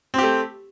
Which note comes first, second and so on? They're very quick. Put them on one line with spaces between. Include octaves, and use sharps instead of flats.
C4 G4 A3